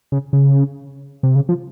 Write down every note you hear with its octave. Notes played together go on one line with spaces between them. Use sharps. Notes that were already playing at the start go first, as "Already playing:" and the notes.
C#3
C#3
C3
C#3
F3